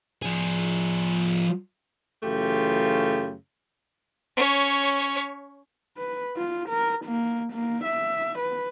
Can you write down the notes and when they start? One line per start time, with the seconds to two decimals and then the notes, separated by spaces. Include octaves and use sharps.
0.22 F3 G#4
2.23 F#2 C#3 E3 A3 F4 G4
4.37 C#4 C#5
5.98 B4
6.37 F4
6.69 A#4
7.05 A#3
7.53 A#3
7.84 E5
8.39 B4